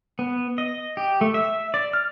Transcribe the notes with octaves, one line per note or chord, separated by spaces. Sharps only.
B3
D#5
G4
A3
E5
D5
F6